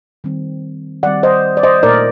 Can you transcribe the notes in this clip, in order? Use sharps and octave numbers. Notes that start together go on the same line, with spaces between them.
D#3 G3 C4
D#3 G3 C4 D5 F#5
C5 D#5
D5
C5 D#5
A#2 A3 D#4 A#4 D5